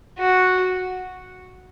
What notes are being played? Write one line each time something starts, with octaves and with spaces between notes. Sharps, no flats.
F#4